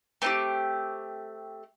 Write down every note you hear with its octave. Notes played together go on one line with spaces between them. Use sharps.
A3 C4 D#4 G4